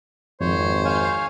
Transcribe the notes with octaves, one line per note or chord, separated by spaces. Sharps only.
G#1 F2 C5 C#5
C#5 F5 G#5